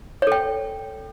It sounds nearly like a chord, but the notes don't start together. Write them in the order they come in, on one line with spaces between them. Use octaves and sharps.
C#5 A4 G5